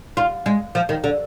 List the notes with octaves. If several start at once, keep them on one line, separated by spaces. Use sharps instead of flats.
F4
G#3
F3
D#3
D3